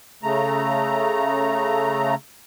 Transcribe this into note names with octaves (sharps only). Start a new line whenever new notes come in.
C#3 A3 A#5